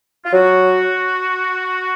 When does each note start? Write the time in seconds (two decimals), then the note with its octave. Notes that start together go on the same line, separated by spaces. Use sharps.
0.25 F4
0.32 F#3 F#4